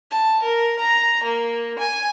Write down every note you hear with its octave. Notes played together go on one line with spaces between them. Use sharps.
A5
A#4
A#5
A#3
G#5